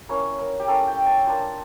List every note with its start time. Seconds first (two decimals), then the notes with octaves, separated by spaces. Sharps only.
0.09 A#3 C#4 E4 C#5
0.39 A#4
0.60 G4
0.68 A#3 C#4 E4 A4
0.87 G5
1.06 A5
1.26 A#3 D4 F4 A5